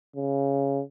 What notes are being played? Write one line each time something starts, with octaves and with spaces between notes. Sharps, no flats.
C#3